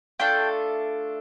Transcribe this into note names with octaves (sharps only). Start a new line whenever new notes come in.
A3 D4 F4 A4 G5 A5